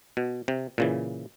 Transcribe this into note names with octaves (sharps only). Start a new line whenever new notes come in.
B2
C3
A#2 C#3 E3